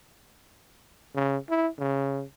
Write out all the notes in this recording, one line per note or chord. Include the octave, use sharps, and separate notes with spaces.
C#3
E4
C#3